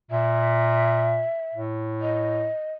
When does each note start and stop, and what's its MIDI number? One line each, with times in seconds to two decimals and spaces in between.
0.11 1.24 46
0.11 1.60 76
1.54 2.49 45
2.01 2.73 75